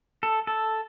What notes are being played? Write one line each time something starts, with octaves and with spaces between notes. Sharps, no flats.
A4
A4